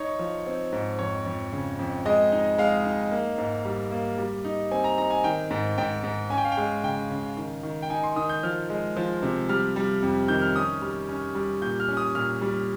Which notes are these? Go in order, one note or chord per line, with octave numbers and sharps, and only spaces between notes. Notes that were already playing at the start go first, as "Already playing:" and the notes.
Already playing: D#4 C#5
F3
C4
G#2
F2 C#5
F2
C#3
F2
G#3 D#5
D#4
G#3 F5
D#4
A#3
G#2
G3
A#3
G3
D#4
C4 G#5
A#5
D#4 A#5
G#5
D#3 G5
G#2
G#2 G5
G#2
C#4 G#5
G5
F5
G5
G#3
C#3 G5
C#3
D#3
D#3
G5
D#4 G#5
C6
D#3 D#6
G6
F3 F6
G#3
F3
C3
G3 F6
G3
F2
D#3 G6
F6
C#4 D#6
G3
C#4
G3
A#2 G6
F6
C#4
D#6
A#2 F6
G3